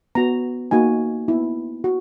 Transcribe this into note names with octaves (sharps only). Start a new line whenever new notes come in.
B3 F#4 A#5
A#3 D#4 F#4 G#5
B3 E4
F#4